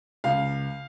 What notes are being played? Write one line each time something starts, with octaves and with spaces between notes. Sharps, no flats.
C#2 F5